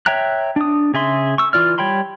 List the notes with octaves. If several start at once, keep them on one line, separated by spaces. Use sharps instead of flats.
C#5 E5 G5 A#5 F#6
D4 D#6
C#3 G#4 E5 C6
C#6 E6
E3 F4 D5 F6
G3 C#5 G5 B5 C6